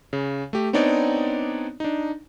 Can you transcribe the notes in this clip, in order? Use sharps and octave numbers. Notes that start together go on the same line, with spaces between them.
C#3
A3 G4
B3 C4 D4 D#4 C#5 D5
D4 D#4